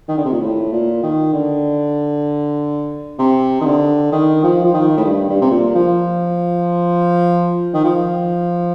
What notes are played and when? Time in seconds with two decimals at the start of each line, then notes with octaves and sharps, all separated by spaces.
0.09 D#3
0.17 D3
0.25 C3
0.32 A#2
0.40 A2
0.72 A#2
1.03 D#3
1.33 D3
3.19 C3
3.61 D#3
3.66 D3
4.12 D#3
4.44 F3
4.64 F3
4.74 D#3
4.97 A2
5.05 G2
5.29 G2
5.41 C3
5.51 A#2
5.75 F3
7.74 D#3
7.84 F3